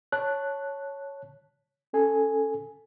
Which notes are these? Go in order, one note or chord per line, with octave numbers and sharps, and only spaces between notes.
C#5 A5 F#6
C#4 A4 G#5